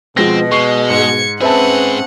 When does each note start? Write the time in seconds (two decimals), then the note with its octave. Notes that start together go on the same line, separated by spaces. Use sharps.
0.17 B2 F3 G#3 C4 A#6
0.52 G#3 C#6 C7
0.90 G#2 G#6 C#7
1.41 G#2 C4 C#4 G#4 B4 E5 F#5 A5